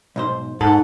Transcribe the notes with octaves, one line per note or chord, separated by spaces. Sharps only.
B1 G#2 C5
G#2 D#4 A4 F#5